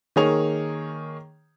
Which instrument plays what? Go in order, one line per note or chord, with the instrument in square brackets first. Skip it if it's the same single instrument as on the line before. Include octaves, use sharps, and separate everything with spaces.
[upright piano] D#3 A#3 G#4 C#5 F7